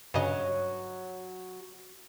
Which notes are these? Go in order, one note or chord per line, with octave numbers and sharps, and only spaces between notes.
G2 C#3 F#3 D#5